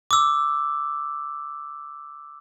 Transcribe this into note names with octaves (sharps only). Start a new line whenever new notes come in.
D6 E6